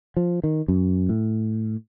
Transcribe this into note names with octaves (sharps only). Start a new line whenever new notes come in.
F3
D#3
F#2
A2